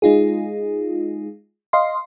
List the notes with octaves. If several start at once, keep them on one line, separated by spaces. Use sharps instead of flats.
G#3 D#4 F4 G#4
D#5 F5 C6